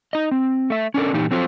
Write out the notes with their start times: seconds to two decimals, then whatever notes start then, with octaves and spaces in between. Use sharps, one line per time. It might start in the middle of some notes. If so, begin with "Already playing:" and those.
0.13 D#4 D#5
0.31 C4
0.70 A3 E5
0.94 C#4 D4 A4 A#4
1.13 A#2 E3 D#4 G4
1.31 F3 F#3 C4 F4 A4 C5